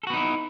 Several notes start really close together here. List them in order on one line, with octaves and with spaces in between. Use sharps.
A4 F#4 B3 D#4 E4